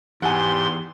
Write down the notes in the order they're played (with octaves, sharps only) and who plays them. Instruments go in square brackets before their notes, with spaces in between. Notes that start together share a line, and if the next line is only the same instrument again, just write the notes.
[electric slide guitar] E2 [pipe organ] G#2 C6 [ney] G4 [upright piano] F#5 G#5